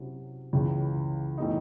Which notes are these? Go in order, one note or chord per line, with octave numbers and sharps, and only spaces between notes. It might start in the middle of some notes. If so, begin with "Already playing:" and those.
Already playing: C3 F#3 C#4 E4
C#2 C#3 E3 G#3
A2 E3 G#3 D#4